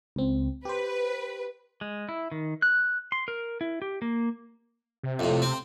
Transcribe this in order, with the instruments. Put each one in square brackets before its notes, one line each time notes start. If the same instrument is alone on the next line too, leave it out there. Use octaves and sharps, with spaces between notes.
[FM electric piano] C#2 C4
[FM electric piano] G4 C5 [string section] B4
[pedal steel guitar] G#3
E4
D#3
F#6
C6
A#4
E4
G4
A#3
[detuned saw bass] C3
[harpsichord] F2 A2
C4